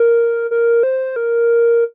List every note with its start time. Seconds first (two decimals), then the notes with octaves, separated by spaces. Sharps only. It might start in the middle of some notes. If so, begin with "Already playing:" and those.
Already playing: A#4
0.51 A#4
0.83 C5
1.16 A#4